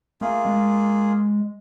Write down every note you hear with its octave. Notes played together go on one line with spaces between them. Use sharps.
A3 A#3 F4 G#4
G#3